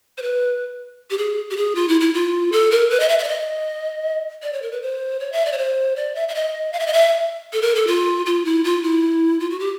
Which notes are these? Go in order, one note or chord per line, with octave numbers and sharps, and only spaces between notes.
C5
B4
G4
G#4
G4
G#4
F4
E4
E4
F4
A4
A#4
B4
D#5
E5
E5
D5
D#5
D5
C#5
A#4
B4
C5
C#5
E5
D5
C#5
C5
D5
E5
E5
D#5
F5
E5
D#5
E5
A4
A#4
A4
F4
F4
E4
F4
E4
F4
F#4
G4